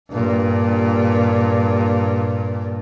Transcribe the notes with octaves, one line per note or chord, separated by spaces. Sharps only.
G2 A#2